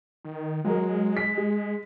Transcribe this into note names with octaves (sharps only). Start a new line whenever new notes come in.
D#3
F#3 G#3 A#4
B6
G#4